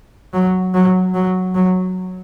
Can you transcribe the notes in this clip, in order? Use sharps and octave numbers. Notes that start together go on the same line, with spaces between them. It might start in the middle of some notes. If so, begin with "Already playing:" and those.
F#3
F#3
F#3
F#3